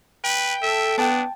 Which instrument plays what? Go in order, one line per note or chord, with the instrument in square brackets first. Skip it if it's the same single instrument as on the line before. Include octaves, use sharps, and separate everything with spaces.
[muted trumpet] B4 [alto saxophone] G5
[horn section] A4 [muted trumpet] E5
[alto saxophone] B3 [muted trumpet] D4 [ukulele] G5 A5